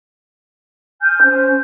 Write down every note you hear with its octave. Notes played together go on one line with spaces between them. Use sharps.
G#5 F6 G6
C#4 C5